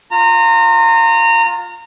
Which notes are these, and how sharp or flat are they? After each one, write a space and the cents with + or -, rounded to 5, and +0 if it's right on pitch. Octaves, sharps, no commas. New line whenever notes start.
F4 +20 A#5 -25